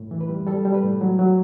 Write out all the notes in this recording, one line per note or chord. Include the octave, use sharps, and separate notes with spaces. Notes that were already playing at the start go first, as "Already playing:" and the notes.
Already playing: A2
E3
B4
G3
G3 A4
G3
B4
A2
F#3
F#3